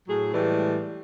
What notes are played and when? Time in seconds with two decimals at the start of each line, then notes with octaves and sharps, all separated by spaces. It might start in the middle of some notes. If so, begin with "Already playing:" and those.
0.08 A2 F#3 G#4
0.34 A2 E3 G3 G#3